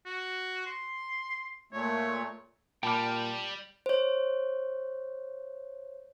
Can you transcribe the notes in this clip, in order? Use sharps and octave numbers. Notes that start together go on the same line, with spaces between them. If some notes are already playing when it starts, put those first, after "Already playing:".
F#4
C6
A#2 A3 C#5
A#2 G3 G5 A5 B5 D6 F6
C5 C#5